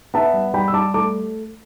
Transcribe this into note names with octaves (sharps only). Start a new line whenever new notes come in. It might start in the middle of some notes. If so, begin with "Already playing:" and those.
B3 E5 A5
G3
G3 G5 B5
E6
G3 A5 D6
A3 A5 D6